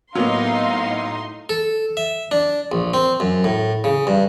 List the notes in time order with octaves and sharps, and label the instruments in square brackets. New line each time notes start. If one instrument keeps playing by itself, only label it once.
[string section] A2 D#4 C6 [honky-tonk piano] F#3 A#3 B3 [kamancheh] F5
[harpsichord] A4
E5
D4
A#1
C4
F#2
A2
C#3
G2